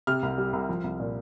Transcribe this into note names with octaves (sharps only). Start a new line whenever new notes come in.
C3 F6
C2
G3
C2
F3
C2
A#2